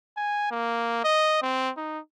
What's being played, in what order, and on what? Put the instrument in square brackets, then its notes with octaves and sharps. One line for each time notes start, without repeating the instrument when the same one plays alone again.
[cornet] G#5
A#3
D#5
C4
D#4